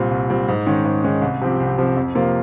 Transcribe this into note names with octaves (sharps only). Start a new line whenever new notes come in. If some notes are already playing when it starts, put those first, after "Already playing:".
Already playing: C2 A#2 G3 C4
C2
A#2 G3 C4
G#2
D#3 G#3 C#4
G#2
D#3 G#3 C#4
C2
C3 F3 C4 G4
C2
C3 F3 C4 G4
F2
C3 F3 A#3 F4